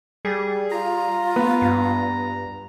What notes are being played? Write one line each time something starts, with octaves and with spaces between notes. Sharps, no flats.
G3 G#4
F4 A#5
B3
G2